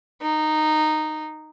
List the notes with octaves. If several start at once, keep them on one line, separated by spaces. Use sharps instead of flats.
D#4